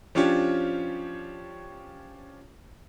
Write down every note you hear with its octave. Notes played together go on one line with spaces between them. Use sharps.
F3 C#4 D4 F4 G4 C#5